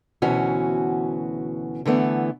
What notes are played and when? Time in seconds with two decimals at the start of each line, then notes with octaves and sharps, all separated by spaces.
0.22 D2 B2 E3 C#4 F#4
1.85 D3 E3 A3 B3